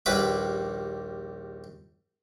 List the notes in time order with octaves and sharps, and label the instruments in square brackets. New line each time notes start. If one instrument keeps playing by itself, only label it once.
[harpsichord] A#1 D#2 G3 B4 B5 D6